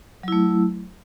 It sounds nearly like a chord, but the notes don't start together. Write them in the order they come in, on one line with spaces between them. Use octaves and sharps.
F#3 E4 A3